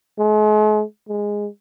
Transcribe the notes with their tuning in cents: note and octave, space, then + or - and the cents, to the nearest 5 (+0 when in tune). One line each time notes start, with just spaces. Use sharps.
G#3 +45
G#3 -10